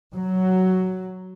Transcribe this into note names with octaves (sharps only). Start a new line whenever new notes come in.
F#3